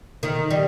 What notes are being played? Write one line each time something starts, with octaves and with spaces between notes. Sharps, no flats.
D#3
G3